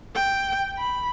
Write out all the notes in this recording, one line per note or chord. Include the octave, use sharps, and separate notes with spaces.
G5
B5